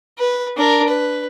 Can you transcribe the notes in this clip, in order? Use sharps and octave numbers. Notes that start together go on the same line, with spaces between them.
B4
D4 A#4
B4